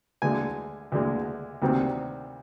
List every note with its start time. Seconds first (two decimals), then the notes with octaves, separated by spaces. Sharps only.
0.22 D2 D3 G#3 G#5
0.92 D2 D3 G#3
1.62 D2 C3 D#3 G3 C4